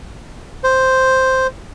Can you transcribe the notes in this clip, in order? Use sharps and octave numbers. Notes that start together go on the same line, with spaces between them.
C5